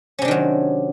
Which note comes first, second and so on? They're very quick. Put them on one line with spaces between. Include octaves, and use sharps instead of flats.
C#4 C3 D4 D#3 F#3